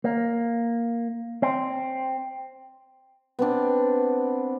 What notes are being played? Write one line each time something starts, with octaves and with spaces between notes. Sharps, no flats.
A#3
C4
B3 C4 D4